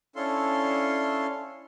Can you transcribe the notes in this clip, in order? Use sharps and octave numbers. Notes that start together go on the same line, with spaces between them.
C#4 D4 E4 A4 F5 C6